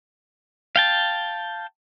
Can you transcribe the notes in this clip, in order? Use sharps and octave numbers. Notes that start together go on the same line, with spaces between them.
F5 G5 A5